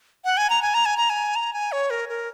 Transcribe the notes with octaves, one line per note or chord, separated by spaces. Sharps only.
F#5
G#5
A#5
G#5
A#5
G#5
A#5
G#5
A#5
G#5
C#5
A#4
A#4